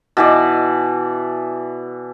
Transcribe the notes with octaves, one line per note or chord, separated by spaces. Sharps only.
B2 E3 D5